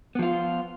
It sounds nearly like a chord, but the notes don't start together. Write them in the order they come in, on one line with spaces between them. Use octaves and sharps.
B3 F3 F4